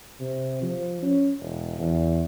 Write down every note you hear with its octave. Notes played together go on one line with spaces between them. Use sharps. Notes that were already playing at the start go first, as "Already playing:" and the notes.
C3
F3
C#4
E1
E2